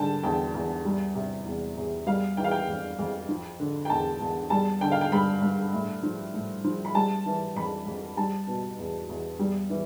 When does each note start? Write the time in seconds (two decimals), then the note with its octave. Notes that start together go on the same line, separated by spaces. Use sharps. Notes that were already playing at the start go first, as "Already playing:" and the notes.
Already playing: D3 G3 G5 A5
0.23 E2 G5
0.54 E2
0.85 G3
1.15 C3
1.46 E2
1.77 E2
2.06 G3 F5
2.37 E3 G5
2.44 F5
2.51 G5
2.68 F2
2.99 F2
3.29 F3
3.60 D3
3.85 G5
3.90 E2 A5
4.20 E2
4.50 G3 A5
4.81 D3 G5
4.92 F5
5.01 G5
5.12 G2 B5
5.42 G2
5.73 A2
6.03 F3
6.34 A2
6.64 F3
6.85 B5
6.95 G3 A5
7.26 E3
7.56 F2 B5
7.86 F2
8.17 G3 A5
8.47 B2
8.78 E2
9.09 E2
9.39 G3
9.70 E3